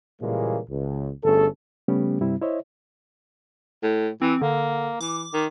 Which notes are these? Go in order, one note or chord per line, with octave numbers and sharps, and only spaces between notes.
A#2 C#3 E3 G3 G#3 A#3
C#2
G1 A3 C#4 G#4 A4
C#3 G3 A3 B3 C#4 G4
G2 C3 G3 C4 E4
E4 C5 C#5 D#5 E5
A2
E3 C4
D3 A#3
E3 D6
D#3